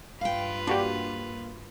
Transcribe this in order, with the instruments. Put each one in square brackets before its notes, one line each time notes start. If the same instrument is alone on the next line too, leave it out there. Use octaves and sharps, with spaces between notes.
[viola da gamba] G2 F4 B4 [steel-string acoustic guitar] F5 G5
[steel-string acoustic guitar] A#3 [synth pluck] D4 F#4 G4